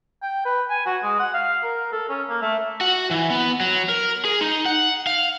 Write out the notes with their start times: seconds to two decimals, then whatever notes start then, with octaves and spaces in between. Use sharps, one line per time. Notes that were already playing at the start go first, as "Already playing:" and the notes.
0.22 G5
0.45 B4
0.70 G#5
0.86 F#4
1.03 G#3
1.19 F#5
1.34 F5
1.63 A#4
1.92 A4
2.09 C#4
2.28 A#3
2.41 A3
2.81 F#4
3.11 E3
3.30 B3
3.60 F#3
3.89 A#4
4.25 G#4
4.41 D#4
4.66 F#5
5.07 F5